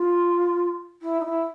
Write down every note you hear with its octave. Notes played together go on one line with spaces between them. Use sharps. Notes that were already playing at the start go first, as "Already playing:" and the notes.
Already playing: F4
E4
D#4
E4